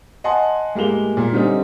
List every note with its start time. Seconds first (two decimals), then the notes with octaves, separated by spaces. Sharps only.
0.24 D#5 F#5 G#5 A5 C6
0.75 A2 G#3 A#3 G4 F7 G7
1.17 A#2
1.33 D3 G3 C4 C#4 D#4